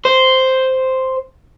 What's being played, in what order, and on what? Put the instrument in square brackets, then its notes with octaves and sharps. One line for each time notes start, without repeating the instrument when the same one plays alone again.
[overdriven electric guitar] C5